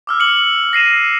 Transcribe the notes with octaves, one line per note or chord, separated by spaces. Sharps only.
D6 E6 F6
C#7 F#7
A#6 C7 D#7 E7